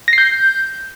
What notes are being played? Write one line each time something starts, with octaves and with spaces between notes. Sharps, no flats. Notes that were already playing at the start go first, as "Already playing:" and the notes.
A#6
C7
G6